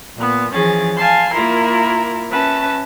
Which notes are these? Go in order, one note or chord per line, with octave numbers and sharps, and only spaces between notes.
A#2 B3
E3 F3 C#4 G#4 A6
F5 G#5 A5 C6
A#3 E4 F4 A#4
C#4 B4 E5 A5